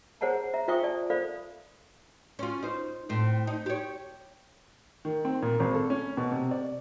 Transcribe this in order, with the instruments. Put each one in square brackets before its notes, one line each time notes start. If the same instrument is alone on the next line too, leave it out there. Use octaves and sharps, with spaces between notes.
[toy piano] G#4 C5 C#5 F#5 A5 A#5
E5 A#5
F4 C5 E5 G5 C#6 D#6
D5 A5
A4 C5 D5 F5 B5
[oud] C#4 F4
D#4 C5
A2 C4
D#4
G4 C#5
[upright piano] D#3
C4
A#2
G#1
A4
C#4
B2
C3
D5